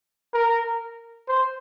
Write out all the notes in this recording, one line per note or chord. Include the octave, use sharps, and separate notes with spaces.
A#4
C5